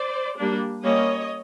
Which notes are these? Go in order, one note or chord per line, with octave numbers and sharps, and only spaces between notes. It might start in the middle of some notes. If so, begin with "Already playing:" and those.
Already playing: C5 D5
G3 A#3 D4
G3 A#3 C#4 C#5 D#5